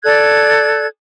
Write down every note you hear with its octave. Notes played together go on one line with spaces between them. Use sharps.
A4 D5 F#6 G#6